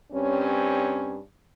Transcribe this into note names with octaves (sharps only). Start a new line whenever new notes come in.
G2 C4 C#4